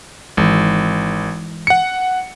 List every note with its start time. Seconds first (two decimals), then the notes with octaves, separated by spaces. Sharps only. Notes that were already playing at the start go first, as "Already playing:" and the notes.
0.37 G#1 E3 G#3
1.67 F#5 C#7